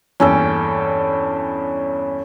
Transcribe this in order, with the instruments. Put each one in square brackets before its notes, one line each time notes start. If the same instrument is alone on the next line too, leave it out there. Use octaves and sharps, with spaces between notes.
[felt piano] E2 G2 A#3 [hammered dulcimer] C#4 A4 G5